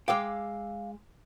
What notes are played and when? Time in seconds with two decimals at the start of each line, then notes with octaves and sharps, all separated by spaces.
0.08 G#3 F5 G5 D6 E6